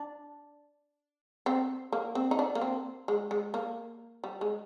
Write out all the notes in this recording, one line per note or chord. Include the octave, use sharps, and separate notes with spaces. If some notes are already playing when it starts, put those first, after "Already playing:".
Already playing: D4
C4
A#3
C4
D#4
D4
A#3
C4
G#3
G#3
A#3
G3
G#3